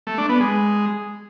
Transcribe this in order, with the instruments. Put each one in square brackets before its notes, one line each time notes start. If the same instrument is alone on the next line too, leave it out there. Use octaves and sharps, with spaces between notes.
[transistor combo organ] A3
D4
B3
G#3